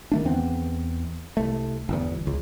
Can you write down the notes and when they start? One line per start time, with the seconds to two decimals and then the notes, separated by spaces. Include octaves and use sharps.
0.12 D#3 A3 D4
0.25 E2 E3 B3 C4
1.37 C2 A3
1.89 G1 E2
2.27 C#2